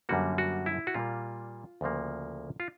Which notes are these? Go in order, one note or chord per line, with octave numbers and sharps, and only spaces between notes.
F#2 D3 G3 A#3 F#4
F#4
E4
F#4
A#2 G3 A#3 F4
D2 C#3 F3 A#3
F4